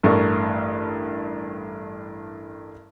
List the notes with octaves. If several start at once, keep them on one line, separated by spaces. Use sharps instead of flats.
A1 G2 A3 A#4 C#6